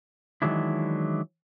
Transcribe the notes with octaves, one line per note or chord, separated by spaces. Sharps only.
D#3 E3 F#3 G#3 D4 E4